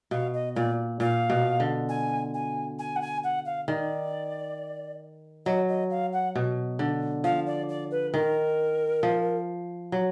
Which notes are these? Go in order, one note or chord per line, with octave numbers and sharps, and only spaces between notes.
B2 F5
D#5
A#2 D5
A#2 F5
B2
D3
G#5
G#5
G#5
F#5
G#5
F#5
F5
D#3 D5
F#3 D#5
D#5
F5
F#5
B2
D3
F3 F5
D5
D5
B4
D#3 A#4
F3
F#3